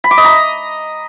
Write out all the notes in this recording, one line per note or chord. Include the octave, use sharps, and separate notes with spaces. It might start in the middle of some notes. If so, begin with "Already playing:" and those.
B5
D6
D#5
A#5